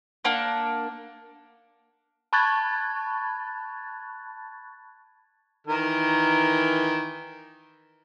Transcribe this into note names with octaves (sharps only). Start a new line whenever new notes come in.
A#3 D4 F#5
A5 B5 C#6 F#6 G#6 A6
D#3 E3 A#4